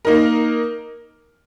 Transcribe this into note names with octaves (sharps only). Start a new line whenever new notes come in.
A#3 D#4 A#4